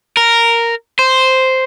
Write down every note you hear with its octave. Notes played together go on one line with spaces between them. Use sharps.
A#4
C5